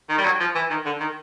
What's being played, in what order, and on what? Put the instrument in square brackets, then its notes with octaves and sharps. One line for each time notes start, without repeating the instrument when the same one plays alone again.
[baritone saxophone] D#3
G3
F#3
F3
E3
D#3
D3
D#3